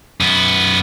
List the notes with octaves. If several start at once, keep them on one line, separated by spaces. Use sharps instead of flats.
F#2 B3